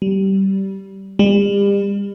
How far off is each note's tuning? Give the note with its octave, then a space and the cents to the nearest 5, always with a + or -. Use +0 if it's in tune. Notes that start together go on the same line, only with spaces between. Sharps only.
G3 -20
G3 +40